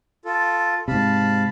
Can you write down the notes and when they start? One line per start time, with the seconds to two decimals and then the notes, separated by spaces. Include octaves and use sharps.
0.25 F4 A4
0.88 G#2 C3 F5 A5 B5